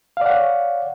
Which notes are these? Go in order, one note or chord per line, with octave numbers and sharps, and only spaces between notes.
C#5 D5 F5 F#5